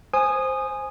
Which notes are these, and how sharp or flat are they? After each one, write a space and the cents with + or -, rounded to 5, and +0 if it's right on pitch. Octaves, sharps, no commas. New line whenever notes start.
C5 +0 G#5 +0 D#6 -15